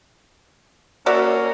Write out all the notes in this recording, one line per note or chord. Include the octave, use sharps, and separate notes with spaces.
A#3 C#4 F#4 A#4 D5 E5